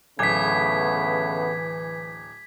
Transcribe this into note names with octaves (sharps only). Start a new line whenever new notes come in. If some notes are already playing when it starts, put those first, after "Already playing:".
D1 C#3 E3 A3 B3 G#6 B6